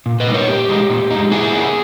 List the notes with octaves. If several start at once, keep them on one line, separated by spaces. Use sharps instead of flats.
A#2
B4 D#5
G3 B3 D#4
A#4 C#5
A#2 G4
G#3 D#4
A#2
G#3 D#4
A#2 E4 G#4
A#3 C#4 E4